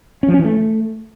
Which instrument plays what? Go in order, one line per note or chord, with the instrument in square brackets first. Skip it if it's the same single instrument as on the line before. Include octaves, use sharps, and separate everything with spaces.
[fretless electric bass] C#4
F3
C#4
E3
A3